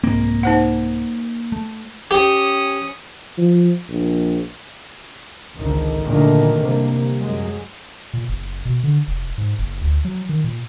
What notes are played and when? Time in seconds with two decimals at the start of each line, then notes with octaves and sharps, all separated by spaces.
0.04 C2 G#2 A#3 C4
0.43 D#4 C5 F#5
1.52 A3
2.11 C#4 G4 D#6
3.38 F3
3.89 A#1
5.58 G#1 C#2 D3 D#3
6.06 A#2 D3 D#3 F#3 A3 A#3
6.60 C3 G3 A#3
7.17 F#2 F#3 G#3
8.13 A#2
8.29 F#1
8.65 B2
8.83 D3
9.08 F1
9.38 G#2
9.59 F#1
9.81 D2
10.04 F#3
10.29 D#3
10.44 A#2